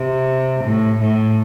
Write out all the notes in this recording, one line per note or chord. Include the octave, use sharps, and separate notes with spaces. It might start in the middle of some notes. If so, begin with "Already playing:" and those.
Already playing: C3
A2
A2